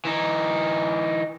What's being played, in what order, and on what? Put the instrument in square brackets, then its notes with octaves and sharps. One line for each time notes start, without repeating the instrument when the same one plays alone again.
[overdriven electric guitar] E3 D#4